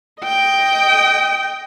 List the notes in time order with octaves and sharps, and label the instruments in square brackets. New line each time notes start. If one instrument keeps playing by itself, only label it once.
[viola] D#5 G5